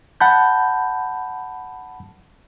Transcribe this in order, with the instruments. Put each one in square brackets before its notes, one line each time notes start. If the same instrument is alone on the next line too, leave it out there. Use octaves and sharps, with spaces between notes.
[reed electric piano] F#5 A5 B5 G6